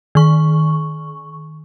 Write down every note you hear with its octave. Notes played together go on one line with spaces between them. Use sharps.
D#3 C#6